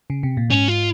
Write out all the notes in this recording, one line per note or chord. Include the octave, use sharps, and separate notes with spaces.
C#3
C3
A#2
G#2 C#4
F4